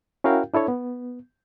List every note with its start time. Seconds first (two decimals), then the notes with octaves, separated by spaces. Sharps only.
0.24 C#4 E4 F#4 A#4 F5 G5
0.54 D4 E4 A4 C#5
0.68 B3